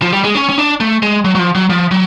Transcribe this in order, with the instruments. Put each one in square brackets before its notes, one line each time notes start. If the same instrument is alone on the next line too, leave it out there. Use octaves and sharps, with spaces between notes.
[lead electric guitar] F3
G3
G#3
C#4
C#4
D4
A3
G#3
F#3
F#3
F3
F#3
F3
F#3